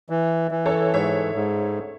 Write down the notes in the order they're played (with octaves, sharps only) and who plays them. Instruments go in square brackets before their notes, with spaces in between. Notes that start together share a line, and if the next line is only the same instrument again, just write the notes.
[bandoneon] E3
E3
[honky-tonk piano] A4 C#5
[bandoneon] G#2 [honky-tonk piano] C#5 E5
[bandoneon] G#2